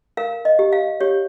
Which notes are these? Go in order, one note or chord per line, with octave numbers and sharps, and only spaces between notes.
A#4 F5
D#5
G4
F5
G4 C#5